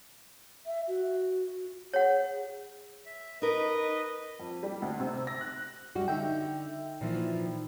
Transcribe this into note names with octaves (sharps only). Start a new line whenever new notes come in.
E5
F#4
G#4 C#5 F#5
E5
D#4 A#4 B4 D#5
F2
G3
D2
C3
A#6
F#6
F#2 G3 F#4
D3 D#4 E5 G5
A#2 E3 F3